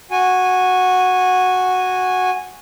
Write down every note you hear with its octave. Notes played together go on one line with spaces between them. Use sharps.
F#4 G#5